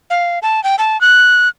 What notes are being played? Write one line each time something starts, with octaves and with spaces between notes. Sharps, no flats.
F5
A5
G5
A5
F#6